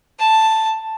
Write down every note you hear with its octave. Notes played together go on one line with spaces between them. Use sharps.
A5